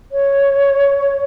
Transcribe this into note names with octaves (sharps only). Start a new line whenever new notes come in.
C#5